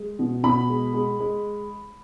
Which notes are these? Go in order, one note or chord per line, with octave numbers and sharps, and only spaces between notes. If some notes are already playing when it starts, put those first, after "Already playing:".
Already playing: G#3
B2
B2 B5
G#3
G#3
G#3